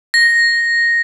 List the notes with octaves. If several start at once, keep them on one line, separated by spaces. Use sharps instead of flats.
A#6